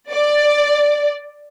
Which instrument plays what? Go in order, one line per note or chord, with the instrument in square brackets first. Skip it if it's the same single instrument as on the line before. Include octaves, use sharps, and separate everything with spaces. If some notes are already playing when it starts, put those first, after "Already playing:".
[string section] D5